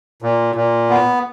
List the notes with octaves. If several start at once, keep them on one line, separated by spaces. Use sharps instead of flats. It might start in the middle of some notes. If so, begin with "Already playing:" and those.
A#2
A#2
B3